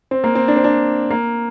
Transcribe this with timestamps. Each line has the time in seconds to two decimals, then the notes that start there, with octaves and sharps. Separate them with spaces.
0.11 C4
0.24 A#3
0.35 C4
0.48 D4
0.57 C4
0.64 D4
1.10 A#3